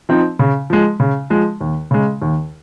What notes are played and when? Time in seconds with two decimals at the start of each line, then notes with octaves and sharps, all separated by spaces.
0.09 F3 C4 D#4
0.39 C#3
0.70 F3 G#3
1.00 C#3
1.30 F3 G#3
1.61 D#2
1.91 C#3 G#3
2.22 D#2